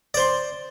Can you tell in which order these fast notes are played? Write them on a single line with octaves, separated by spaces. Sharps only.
D5 C5 C6